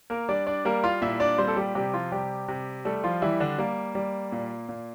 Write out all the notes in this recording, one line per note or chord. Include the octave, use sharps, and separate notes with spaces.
A#3 A#4
G3 D4 D5
D4 D5
G3 A#3 A#4
F4 F5
A#2 E4 E5
D4 D5
G3 C4 C5
A4
G3 G4
C3 G3 G4
F3 F4
C3 G3 G4
C3
G3 A3 A4
F3 F4
E3 G3 E4
D3 D4
G3 A#3
G3
A#2
A#2